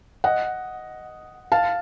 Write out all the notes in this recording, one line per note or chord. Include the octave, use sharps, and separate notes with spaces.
D#5 F#5
F5 A5